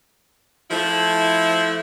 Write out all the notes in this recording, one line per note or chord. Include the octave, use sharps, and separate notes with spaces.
F3 A3 E4